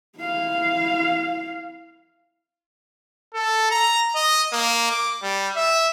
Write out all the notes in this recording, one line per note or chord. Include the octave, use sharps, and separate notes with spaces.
E4 F5
A4
A#5
D#5
A#3
D6
G3
E5